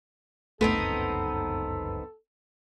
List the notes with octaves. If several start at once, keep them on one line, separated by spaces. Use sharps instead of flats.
G1 C#2 F#2 A3 B3 C4 D#4 A4